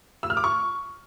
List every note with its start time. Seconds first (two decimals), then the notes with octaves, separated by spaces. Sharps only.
0.23 E6
0.30 F6
0.37 D6
0.44 C#6